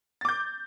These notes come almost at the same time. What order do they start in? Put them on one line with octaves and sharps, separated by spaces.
A6 D6 G6